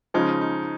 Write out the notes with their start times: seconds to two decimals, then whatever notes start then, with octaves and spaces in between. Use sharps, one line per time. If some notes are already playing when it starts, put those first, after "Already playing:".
0.14 C#3 F3 G#3 D#4
0.41 D#4